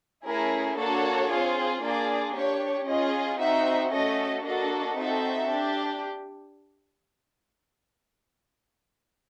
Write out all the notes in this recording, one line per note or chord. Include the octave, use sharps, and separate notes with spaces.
A3 C#4 E4 G#4 A#4
A#3 D4 F#4 A4 C#5
C4 F4 G#4
A#3 D4 F4 G#4 D5
D4 G4 C#5
C#4 F4 G#4 D#5
C4 D#4 F#4 E5
A3 C#4 F#4 A4 D#5
A#3 D4 F#4 A4 D#5
C4 D#4 F#4 A4 E5
D4 G4